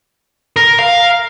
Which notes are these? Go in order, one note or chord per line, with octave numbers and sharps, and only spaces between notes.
A#4
F5